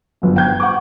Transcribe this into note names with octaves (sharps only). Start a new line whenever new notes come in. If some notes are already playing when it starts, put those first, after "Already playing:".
G1 F#2
G5 G6 G#6
F#5 C#6 D6